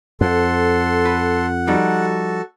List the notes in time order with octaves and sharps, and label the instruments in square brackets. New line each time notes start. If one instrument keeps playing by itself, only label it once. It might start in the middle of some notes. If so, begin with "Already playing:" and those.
[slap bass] F2 [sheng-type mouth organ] A4 C6 [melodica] F#5
[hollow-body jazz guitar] B4
[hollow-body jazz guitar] F3 G3 D#4 [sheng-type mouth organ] F#4 A4